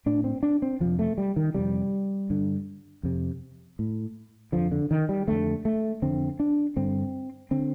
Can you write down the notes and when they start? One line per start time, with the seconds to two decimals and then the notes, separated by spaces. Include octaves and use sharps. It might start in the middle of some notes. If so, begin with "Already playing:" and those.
0.06 A2 D4
0.24 C4
0.43 D4
0.62 C4
0.80 F2 C3 F3
0.99 A3
1.18 G3
1.36 D#3
1.54 F2 C3 G3
2.30 G2 D3
3.03 F2 C3
3.79 A2
4.52 F2 D3 F3
4.72 D3
4.91 D#3
5.09 G3
5.27 F2 D3 A3
5.65 A3
6.02 F2 D3 C4
6.40 D4
6.76 G2 D3 C4
7.51 D3 C4